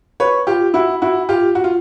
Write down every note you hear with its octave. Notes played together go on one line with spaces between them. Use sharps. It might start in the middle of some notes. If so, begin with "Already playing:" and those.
B4 C#5
F4 G4
E4 F#4
E4 F#4
F4 G4
F#4
F4